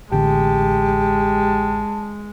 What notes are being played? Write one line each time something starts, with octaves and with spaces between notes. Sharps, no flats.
A1 D3 G#3 G4 A5